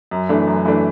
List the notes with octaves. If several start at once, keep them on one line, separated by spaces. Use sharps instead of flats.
F#2
E3 A3 D4
F#2
E3 A3 D4